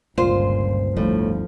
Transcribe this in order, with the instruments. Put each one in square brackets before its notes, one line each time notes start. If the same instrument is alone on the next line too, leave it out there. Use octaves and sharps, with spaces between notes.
[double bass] G1 [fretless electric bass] C#2 A#2 [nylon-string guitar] F4 [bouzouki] C5
[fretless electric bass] G1 D2 [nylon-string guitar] A2 [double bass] F3